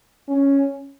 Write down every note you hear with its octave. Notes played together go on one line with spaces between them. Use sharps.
C#4